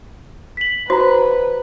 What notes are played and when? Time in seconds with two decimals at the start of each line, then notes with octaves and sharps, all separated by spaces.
0.57 B6 F#7
0.90 F#4 B4 C5 A#5